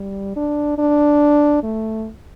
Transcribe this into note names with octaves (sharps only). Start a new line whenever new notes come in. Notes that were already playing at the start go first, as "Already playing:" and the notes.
Already playing: G3
D4
D4
A3